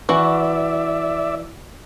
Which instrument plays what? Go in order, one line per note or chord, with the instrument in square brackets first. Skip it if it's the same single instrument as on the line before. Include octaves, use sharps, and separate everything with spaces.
[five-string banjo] E3 [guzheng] F#4 [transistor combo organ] D5 E5